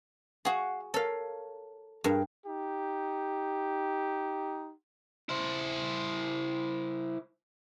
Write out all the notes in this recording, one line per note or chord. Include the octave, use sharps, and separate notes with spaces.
F#4 G#4 F5 F#5
A4 A#4 C#5 F5
G2 G#4 A#4 F5
D#4 G4
E4 C5